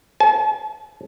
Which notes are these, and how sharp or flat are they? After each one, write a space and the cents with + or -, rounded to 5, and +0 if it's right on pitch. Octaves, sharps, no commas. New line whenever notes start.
A5 -45